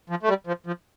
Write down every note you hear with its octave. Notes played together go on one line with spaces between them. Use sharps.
F3
A3
G3
F3
F3